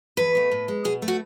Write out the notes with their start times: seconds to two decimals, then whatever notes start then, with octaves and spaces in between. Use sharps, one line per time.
0.17 E2 B4
0.35 B2 A3
0.52 A2
0.68 G#3
0.84 B2 G#4
1.02 A3
1.08 F#4